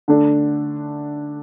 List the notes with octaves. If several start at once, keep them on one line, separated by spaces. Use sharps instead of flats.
D3 A3 D4